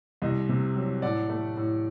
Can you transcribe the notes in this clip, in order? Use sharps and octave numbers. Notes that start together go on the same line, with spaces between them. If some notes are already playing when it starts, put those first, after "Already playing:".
C2 D#5
C3
F#3
A2 D5 F#5
A3
A2